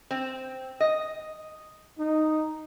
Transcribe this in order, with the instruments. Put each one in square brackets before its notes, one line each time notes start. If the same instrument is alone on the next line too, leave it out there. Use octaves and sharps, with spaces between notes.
[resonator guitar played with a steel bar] C4
D#5
[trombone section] D#4